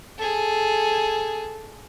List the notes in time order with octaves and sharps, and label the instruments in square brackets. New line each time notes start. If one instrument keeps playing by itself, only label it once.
[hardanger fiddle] G#4 A4